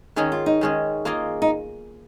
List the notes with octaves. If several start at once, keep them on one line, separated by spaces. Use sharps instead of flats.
D#3 G#3 C#4 D#4 G#4
F4
D#4
D#3 G#3 C#4 G#4
A#3 F4 G#4 D#5
D#4